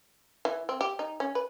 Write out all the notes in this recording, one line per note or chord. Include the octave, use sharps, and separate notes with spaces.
E3
C4
G4
D#4
C#4
B4